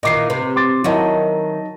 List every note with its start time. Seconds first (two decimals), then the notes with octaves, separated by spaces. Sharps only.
0.03 A#2 D#3 E3 D#5 D6 C7
0.30 C3 B4
0.56 C6 D6 A6
0.84 D#3 F#3 E4 F#4 D#5 A5